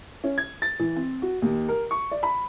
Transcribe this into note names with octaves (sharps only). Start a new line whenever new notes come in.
C#4
G#6
A6
E3
C4
F#4
D#2
A#4
C#6
D5
B5